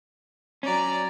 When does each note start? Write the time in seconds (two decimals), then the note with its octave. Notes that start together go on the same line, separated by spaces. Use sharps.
0.63 F#3 C#4 D5 A#5